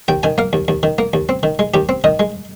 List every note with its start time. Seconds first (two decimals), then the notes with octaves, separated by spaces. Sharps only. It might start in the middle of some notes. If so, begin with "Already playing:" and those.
0.08 D#2 G5
0.23 D#3 G#5
0.38 A#3 F5
0.53 D#2
0.68 D#2
0.83 D#3
0.98 A#3
1.13 D#2
1.29 C4
1.43 D#3
1.59 G#3
1.74 D#2 G4
1.89 C4
2.04 D#3 D#5
2.19 G#3